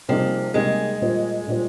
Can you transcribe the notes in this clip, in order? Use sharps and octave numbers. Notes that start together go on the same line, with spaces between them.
C3 F3 G3 A#3 D#4 G#4
C3 G3 G#3 A#3 D#4 G#4
A#2 G3 A#3 F4 C5
A#2 G3 A#3 F4 C5